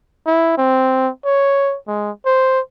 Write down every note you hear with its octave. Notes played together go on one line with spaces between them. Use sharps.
E4
C4
C#5
G#3
C5